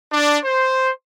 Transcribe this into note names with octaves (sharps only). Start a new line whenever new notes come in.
D4
C5